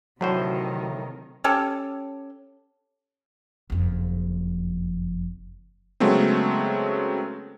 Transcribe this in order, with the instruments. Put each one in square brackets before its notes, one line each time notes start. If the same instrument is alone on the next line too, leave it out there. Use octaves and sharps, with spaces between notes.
[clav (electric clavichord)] D2 A2 C5 [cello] C3 D#3 [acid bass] F#3
[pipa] C#4 G4 A4
[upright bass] F#1 F2
[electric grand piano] C#3 F#3 G#3 A3 B3 C4